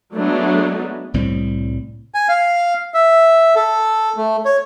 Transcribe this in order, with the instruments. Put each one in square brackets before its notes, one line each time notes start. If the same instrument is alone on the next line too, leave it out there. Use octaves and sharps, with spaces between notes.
[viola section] F#3 G#3 A3 B3 D4 D#4
[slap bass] C2 A2 G3 C4
[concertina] G#5
F5
E5
A4
A3
C#5